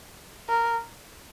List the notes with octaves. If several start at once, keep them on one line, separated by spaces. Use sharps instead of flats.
A#4